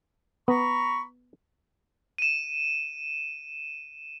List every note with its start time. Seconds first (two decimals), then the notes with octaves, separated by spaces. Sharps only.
0.48 B3 A#5 B5 C#6
2.18 D#7 E7